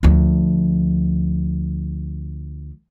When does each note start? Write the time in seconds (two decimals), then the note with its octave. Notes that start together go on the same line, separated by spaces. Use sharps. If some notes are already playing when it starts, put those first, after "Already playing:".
0.03 D2 F3